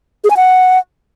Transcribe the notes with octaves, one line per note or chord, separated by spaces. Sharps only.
G#4
G#5
F#5